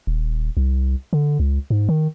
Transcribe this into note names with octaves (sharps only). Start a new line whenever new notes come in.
D#1
C2
D3
C#2
G#2
D#3